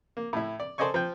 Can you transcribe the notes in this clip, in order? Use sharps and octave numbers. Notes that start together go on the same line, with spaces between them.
A#3
A2 E4
D5
A4 C5 D5 D#5 G#5 C#6
F3 G5